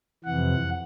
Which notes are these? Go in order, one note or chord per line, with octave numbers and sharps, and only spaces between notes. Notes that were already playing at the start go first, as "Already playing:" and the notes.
F2 C3 E3 F#5